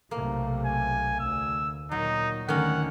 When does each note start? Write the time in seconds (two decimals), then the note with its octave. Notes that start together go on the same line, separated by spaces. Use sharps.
0.11 B1 C3 A3 A#3
0.66 G#5
1.19 D2 E6
1.91 A#2 D#3 F#3 D#4
2.49 D2 D3 D#3 G#3 C#4 F#5